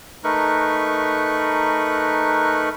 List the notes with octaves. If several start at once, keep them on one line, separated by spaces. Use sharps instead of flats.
A3 D#4 A#4 B4 C#6 F#6